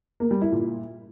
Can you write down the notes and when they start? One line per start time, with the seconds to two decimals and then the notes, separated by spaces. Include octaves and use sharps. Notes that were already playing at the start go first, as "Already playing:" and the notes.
0.20 A#3
0.31 G3
0.41 E4
0.52 A#2